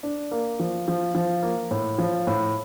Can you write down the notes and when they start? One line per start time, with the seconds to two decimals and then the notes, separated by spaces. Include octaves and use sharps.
0.03 D4
0.31 A#3
0.60 F3
0.88 F3
1.15 F3
1.43 A#3
1.71 A2
1.98 F3
2.27 A2